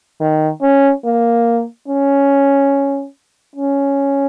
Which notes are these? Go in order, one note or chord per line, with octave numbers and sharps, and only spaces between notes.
D#3
C#4
A#3
C#4
C#4